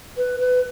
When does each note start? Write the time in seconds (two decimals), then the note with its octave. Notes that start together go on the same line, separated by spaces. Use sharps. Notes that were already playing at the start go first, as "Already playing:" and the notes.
0.17 B4
0.40 B4